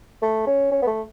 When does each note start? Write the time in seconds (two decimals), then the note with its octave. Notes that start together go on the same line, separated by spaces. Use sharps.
0.22 A3
0.47 C#4
0.72 C#4
0.82 B3
0.87 A3